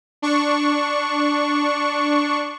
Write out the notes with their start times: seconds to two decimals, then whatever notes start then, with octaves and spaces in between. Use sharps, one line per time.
0.22 D4 C#6